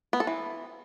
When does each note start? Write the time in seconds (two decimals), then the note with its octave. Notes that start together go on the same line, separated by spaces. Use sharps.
0.13 B3
0.20 A4
0.27 E3